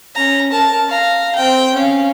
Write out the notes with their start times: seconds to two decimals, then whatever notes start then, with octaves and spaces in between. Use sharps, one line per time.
0.15 C#4 A#5
0.52 A#4 A5
0.89 F5 A#5
1.35 C4 G5
1.74 C#4 F5